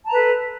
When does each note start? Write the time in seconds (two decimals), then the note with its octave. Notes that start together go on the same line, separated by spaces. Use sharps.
0.06 A5
0.09 A#5
0.12 B4
0.15 A4